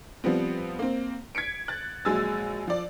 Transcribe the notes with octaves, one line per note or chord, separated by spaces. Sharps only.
F3 G3 B3 C4
A#3 C4
G#6 B6 C#7 D7
F#6 A6
A#1 F#3 G#3 G#5 E6 A6
F3 D5